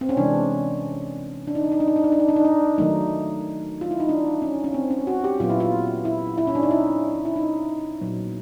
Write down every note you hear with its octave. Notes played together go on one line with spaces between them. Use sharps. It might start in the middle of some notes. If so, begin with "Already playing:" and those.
C4
C#4
C3 E3 G#3 D4
D4
D#4
D4
D#4
D4
D#4
D4
D#4
D4
D#4
D4
D#4
D4
D#3 F#3 A3 D#4
F4
E4
D#4
D4
C#4
C#4
C4
C#4
F#4
G4
A#2 F#3 B3 F4
E4
F4
E4
E4
C#4
D4
D#4
E4
E4
D#4
A#2 F#3 B3